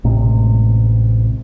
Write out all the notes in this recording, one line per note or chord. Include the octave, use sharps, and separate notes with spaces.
A1 A2 C3 G#3